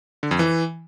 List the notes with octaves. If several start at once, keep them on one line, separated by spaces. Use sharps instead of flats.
D3
F2
E3